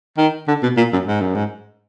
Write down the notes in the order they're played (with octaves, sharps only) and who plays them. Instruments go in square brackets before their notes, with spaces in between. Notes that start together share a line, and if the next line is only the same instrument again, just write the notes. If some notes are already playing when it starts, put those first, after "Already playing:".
[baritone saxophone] D#3
D3
B2
A#2
F#2
G#2
F#2
G#2